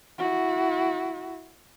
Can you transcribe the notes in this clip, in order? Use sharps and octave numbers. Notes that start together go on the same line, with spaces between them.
E4 F#4